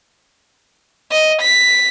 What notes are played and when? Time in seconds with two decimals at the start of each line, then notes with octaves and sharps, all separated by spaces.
1.12 D#5
1.41 B6